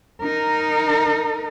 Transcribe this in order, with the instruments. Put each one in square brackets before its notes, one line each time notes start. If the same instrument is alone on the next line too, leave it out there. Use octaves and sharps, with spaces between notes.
[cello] D#4 A#4